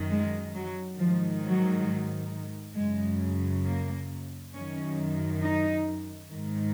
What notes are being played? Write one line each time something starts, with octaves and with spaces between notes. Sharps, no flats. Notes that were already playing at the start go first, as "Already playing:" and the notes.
Already playing: F#2 D#3
G#3
F#3
G#2 D#3 F3
F#3
F#2 C#3 G#3
A#3
F#2 D#3 C#4
D#4
G#2 D#3